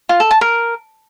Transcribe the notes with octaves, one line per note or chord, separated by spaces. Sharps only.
F4
A4
A5
A#4